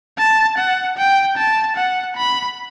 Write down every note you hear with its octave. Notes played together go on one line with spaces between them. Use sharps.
A5
F#5
G5
A5
F#5
B5